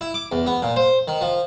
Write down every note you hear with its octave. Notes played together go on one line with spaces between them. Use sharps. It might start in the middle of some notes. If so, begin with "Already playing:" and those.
E4
D6
E2
B3
A#2
C5
D#3
F3